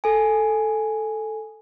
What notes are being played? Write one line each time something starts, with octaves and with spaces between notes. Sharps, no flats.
A4 G#5